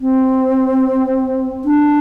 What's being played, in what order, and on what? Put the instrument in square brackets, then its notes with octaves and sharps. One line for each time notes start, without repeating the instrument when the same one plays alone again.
[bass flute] C4
D4